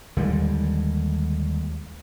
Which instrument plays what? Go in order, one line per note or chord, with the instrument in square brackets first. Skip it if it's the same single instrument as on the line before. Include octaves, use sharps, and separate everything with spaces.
[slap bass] D#2 D3 G3 G#3